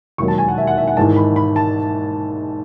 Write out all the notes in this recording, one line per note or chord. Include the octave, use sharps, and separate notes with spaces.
E1 D#2 D#3 F#3 C#6
A5
G#5
F#5
E5
F#5
E5
F#5
G#1 G#2 E3 G#3 A5
B5
B5
A5